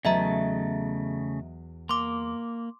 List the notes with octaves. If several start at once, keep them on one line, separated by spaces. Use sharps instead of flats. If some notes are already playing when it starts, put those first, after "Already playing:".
E2 C#3 F#3 A3 D#5 E5 A5 A#5
A#3 C6 D6